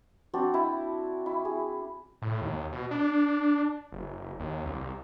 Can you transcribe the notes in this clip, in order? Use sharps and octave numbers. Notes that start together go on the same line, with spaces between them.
C4 D4 F#4 D5
E4
E4
G#4
A2
D#2
B2
D4
F#1
D#2
C2